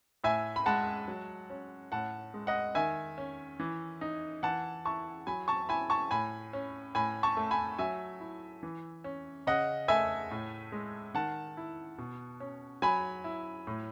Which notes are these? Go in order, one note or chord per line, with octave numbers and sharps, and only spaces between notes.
A2 E5 G#5
B5
G#3 F#5 A5
F#3
C#4
A2 F#5 A5
G#3
D#5 F#5
D#3 E5 G#5
C#4
E3
D#4
E3 F#5 A5
E4 A5 C#6
F#3 G#5 B5
A5 C#6
E4 G#5 B5
A5 C#6
A2 G#5 B5
C#4
A2 G#5 B5
A5 C#6
A3
G#5 B5
F#3 E5 G#5
E4
E3
C#4
C#3 D#5 F#5
A3 E5 G#5
A2
G#3
D#3 F#5 A5
E4
B2
C#4
F#3 G#5 B5
E4
A2